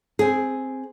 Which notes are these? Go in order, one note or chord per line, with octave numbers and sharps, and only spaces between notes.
C4 G#4